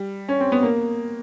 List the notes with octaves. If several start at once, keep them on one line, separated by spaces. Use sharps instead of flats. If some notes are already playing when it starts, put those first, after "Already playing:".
Already playing: G3
C#4
C4
B3
A#3